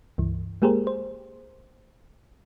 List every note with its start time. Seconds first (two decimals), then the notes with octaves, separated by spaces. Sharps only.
0.18 C#2 G2 E3
0.62 G#3 A#3 G4 G#4 A#4 C5
0.87 C5